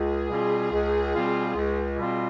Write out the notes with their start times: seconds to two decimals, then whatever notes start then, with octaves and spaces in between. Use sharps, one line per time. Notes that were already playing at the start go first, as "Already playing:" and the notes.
Already playing: C#2 G#4
0.30 B2 G3 C4 F4
0.72 C#2
1.14 B2 G3 C4 F4
1.56 C#2
1.98 B2 G3 C4 F4